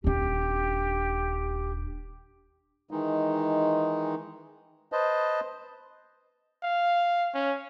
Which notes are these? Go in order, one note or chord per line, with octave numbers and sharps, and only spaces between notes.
D#1 D4 G4
D#3 E3 G#3 D#4
B4 C5 D#5 A5
F5
C#4